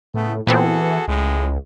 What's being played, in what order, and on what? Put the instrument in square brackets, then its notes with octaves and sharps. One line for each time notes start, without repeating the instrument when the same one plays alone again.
[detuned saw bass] A2 [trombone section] C#3 A3 B3
[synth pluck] A#2 B3 C4 [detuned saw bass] E3 [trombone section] F#4 G#4 A4
[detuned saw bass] C#2 [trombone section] A2 C#3 G#3